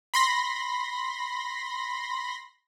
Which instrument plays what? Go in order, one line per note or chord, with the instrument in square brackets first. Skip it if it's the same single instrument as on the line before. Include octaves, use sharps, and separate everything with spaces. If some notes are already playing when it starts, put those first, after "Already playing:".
[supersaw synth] B5 C6 A#6